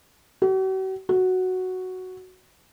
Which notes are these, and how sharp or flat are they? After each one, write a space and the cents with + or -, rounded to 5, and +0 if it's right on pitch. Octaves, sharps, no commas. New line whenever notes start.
F#4 +45
F#4 +0